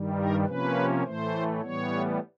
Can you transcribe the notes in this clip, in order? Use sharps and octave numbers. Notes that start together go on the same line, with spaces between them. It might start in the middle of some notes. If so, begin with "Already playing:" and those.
Already playing: G2 D#3 G3
A#4
C3 F3 A#3 C#4 B4
A2 E3 A3 C5
A2 E3 G3 B3 C#5